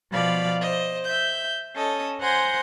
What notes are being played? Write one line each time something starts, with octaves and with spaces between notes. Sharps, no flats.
B2 F3 D5 F5 B5
C5 D#5
E5 G6
C#4 A4 D#5
C5 F#5 G#5 A#5 C6 G6